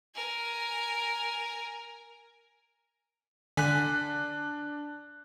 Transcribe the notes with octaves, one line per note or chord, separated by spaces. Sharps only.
A#4 G#5
D3 D4 G#5 F#6 B6